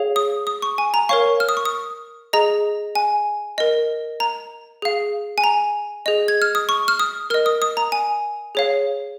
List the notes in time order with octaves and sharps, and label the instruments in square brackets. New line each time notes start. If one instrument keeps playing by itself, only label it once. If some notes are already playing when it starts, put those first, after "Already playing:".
Already playing: [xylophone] G#4 C#5 F5
D#6
D#6
C#6
G#5
A#5
A#4 C#5 F5 C#6
F6
D#6
C#6
D#6
G#4 D#5 A#5
G#5
A#4 D#5
A#5
G#4 F5
G#5
A#5
G#4 D#5
G#6
F6
D#6
C#6
F6
D#6
A#4 D#5 F6
D#6
D#6
A#5
G#5
G#4 C#5 F5